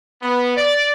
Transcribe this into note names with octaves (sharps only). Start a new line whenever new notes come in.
B3
D5